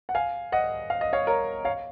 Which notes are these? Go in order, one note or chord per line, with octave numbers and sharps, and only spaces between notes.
F#5
F5 G#5
D#5 F#5
F5
D#5
C#5 F5
A#4 C#5
C#5 F5